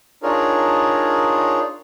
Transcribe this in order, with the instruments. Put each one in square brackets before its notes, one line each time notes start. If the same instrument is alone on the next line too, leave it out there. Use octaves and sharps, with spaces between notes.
[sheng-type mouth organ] D4 D#4 F4 G#4 A#4 C#5